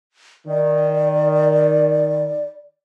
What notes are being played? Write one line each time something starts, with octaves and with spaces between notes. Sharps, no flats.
D#3 D5